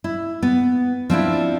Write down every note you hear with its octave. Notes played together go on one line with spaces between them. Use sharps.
E4
B3
F3 C4 D4 E4